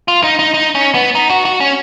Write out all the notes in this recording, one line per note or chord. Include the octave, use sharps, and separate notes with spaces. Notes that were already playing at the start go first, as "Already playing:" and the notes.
F4
D#4
D#4
D#4
C#4
B3
D#4
F#4
F#4
C#4